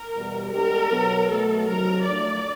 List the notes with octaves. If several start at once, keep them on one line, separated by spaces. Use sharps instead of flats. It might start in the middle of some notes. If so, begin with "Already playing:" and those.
Already playing: A#4
E2 B2 G3
G#3 B3 D4 G4 A#4
B2 F#3 B3
B2 F#3 A3 A4
F2 C3 D#3 F#3 A#4
A2 F3 A3 D4 D5